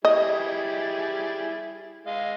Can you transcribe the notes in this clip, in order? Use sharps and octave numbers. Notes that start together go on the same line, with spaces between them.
G3 E4 G#4 D#5
G#3 D#5 F5